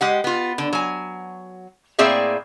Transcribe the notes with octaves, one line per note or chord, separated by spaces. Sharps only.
G#3 G4 F#5
B3 F4
D3
F#3 G#5
A2 A#3 C4 G#4 D5 E5